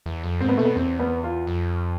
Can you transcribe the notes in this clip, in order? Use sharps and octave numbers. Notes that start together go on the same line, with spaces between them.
E2
F2
G#2 C4
B3
B2 A3
B3
E2 C4
B3
F4
F2